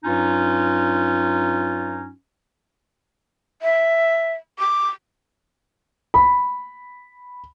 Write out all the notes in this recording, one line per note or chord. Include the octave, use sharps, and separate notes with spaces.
G2 F#3 C#4 D#4 F4
E5
D6
B5